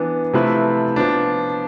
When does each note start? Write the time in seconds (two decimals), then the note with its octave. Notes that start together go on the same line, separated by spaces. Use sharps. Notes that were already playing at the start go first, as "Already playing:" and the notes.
Already playing: E3 B3 D4
0.33 C3 F3 A3 E4 B4
0.96 F3 B3 D4